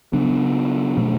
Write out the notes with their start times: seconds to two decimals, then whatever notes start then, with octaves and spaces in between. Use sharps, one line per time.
0.13 C#3 F#3 B3 D4
0.97 B2 F#3 A3